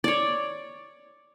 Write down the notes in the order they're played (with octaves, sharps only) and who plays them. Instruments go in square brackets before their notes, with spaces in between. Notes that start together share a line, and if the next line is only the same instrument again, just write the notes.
[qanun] C#5 D5